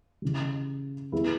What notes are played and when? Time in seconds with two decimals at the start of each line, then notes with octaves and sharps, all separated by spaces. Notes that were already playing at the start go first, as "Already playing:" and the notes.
0.22 C#3 E3 G3
1.12 G3 B3 E4 G#4 B4